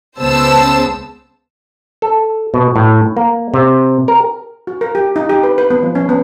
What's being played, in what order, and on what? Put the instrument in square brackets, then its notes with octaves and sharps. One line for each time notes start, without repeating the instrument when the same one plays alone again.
[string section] C#2 C#3 B3 C5 A5 E6
[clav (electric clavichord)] A4
B2
A2
A#3
C3
A#4
[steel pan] F#4
A#4
G4
D#4
G4
B4
B4
B3
F3
C#4
B3